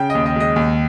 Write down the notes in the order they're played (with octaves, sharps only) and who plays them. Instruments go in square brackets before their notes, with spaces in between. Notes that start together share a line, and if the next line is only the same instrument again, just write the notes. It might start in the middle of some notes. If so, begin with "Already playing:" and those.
Already playing: [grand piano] C#3 G5
D#5
D#2
D#5
G#3 D#5
D#2